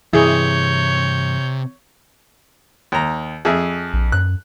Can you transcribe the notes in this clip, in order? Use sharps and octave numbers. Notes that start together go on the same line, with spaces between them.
G2 C3 E3 E4 G#4 C#5 G6
D#2 A#5
F2 G#4 E5
A#1
F#2 F#6